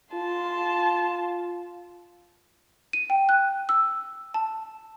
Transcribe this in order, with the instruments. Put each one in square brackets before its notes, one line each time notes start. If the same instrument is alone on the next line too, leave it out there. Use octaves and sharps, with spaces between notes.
[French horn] F4 [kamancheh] A5 C6
[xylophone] D#7
G5
F#6
E6
A5